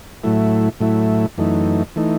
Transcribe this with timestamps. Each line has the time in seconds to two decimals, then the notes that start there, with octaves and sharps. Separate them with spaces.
0.24 A2 F#3 A3 E4
0.80 A2 F#3 A3 E4
1.38 F#2 E3 A3 D#4
1.96 E3 A3 D#4